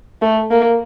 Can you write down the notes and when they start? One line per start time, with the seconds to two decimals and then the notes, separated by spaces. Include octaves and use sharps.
0.22 A3
0.51 A#3